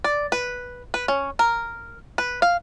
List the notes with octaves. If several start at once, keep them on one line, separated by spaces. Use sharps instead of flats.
D5
B4
B4
C#4
A#4
B4
F5